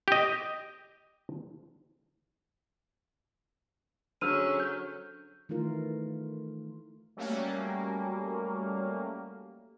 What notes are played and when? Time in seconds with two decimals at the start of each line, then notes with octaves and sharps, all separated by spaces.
0.08 G4 D#5
4.21 D3 F#3 C#4 G#4 C5 E6 F6 D#7
4.60 G6
5.49 D#3 E3 A3 F4 A#4
7.17 F#3 G3 A3 A#3 C#4